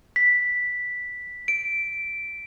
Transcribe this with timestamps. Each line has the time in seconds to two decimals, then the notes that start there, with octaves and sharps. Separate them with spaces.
0.16 B6
1.48 D7